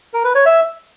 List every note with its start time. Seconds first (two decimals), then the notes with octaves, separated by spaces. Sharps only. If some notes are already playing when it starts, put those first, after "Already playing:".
0.14 A#4
0.24 B4
0.35 C#5
0.46 E5